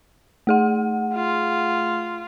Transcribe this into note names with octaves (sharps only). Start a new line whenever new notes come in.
A3 G#4 F#5
F4